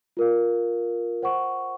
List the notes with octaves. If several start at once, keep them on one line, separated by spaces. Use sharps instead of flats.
F4 A#4 F5
C5 F#5 C#6